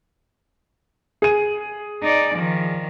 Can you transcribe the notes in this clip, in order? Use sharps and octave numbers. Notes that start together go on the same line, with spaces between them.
G#4 D#7
D#4 D5
D#3 F3